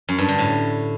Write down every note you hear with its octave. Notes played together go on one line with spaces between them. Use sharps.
F#2
G2
D3
A2